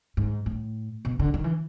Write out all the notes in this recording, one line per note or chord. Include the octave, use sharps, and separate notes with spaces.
G#2
A2
B2
D3
D#3
E3